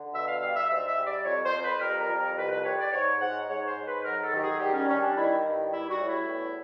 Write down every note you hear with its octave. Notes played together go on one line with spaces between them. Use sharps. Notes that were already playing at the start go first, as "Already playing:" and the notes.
Already playing: D3
B2 E5
F5
G3 F5
E5
G#2 E5
E5
G3
D5
F2 C#5
C5
F2
B4
G3 A#4
A#4
F2
A#4
C2 B4
B4
G3 C#5
D5
G#2 C#5
G#2 F#5
G#2 C#5
C5
G#2
B4
F#3 A#4
A4
D#3 G4
G#4
G3 G4
C#4
G3 C#4
D4
D#3 E4
G2
G3 E4
F#4
A2
E4
E2